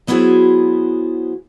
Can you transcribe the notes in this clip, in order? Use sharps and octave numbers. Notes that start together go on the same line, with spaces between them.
F#3 B3 E4 F#4 G#4 C5